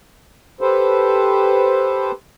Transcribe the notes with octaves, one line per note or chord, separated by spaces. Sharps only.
G4 A4 B4 C5